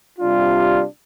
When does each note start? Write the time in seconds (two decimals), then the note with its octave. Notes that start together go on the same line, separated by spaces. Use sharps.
0.19 C3 G3 D4 F4